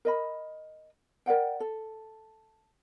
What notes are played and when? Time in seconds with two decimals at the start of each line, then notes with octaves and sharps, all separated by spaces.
0.05 A#4 D#5 B5
1.26 A#4 D5 F#5 G5
1.60 A4